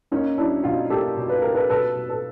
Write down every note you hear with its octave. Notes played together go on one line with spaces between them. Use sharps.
A#3 C#4 D#4
F#3 D4 E4
B2 D#4 F4
A#3 G4 A4
B2
B4
A#3 A#4
A4 B4
B2 A4 B4
B2
A4 B4